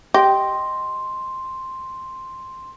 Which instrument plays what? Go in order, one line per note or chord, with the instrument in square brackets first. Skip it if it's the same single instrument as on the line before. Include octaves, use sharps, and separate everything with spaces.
[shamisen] G4 [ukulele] D#5 G5 [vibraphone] C6